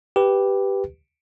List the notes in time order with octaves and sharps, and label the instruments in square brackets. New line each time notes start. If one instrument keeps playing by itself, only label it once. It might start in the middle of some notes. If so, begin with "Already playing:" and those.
[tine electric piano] G4 B4